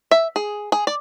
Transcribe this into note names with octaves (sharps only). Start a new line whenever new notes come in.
E5
G#4
G#4
D5